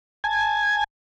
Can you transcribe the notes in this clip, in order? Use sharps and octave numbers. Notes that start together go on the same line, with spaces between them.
G#5 A5 G#6